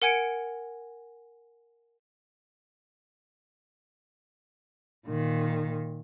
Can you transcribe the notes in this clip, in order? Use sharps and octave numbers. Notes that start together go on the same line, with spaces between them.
A#4 F#5 G#5 G#6 C#7 D7
A#2 D#3